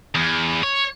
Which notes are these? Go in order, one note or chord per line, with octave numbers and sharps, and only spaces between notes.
E2
C#5